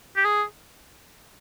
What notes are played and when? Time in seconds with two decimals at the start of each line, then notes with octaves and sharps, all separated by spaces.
0.16 G4
0.25 G#4